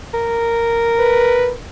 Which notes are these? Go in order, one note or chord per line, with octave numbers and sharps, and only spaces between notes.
A#4
B4